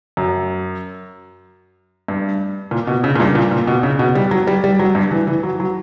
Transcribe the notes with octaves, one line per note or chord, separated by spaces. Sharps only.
F#2
G2
A#2
B2
C#3
A#2
G2
A#2
A#2
B2
C#3
B2
G3
F#3
G3
G3
F#3
G2
E3
E3
F#3
F#3